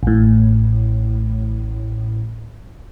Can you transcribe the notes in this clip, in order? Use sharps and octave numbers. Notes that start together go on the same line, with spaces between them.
A1 A2